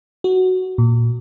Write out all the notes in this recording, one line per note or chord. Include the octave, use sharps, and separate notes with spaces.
F#4
A#2